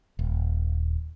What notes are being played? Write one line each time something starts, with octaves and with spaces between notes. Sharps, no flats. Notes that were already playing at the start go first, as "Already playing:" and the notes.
D#1